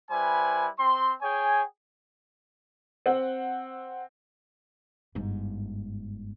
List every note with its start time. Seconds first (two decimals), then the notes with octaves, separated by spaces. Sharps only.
0.11 G3 E4 B4 C5 G#5
0.79 C4 C6
1.22 G#4 C#5 G5 G#5
3.06 C4 F#5
5.15 G1 G#2